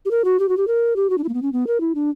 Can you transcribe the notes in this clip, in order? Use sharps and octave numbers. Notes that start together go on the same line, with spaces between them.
G4
A#4
F#4
G4
F#4
G4
A#4
G4
F#4
D4
E4
A#3
B3
C#4
B3
A#4
E4
D4